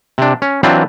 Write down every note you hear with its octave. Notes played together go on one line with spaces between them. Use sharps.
C3 D4
C#4
E3 F#3 C4 D4 F4 B4